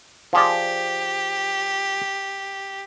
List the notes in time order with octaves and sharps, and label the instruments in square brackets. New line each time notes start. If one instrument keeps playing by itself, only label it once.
[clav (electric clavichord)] F3 G#4 D5 [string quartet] G4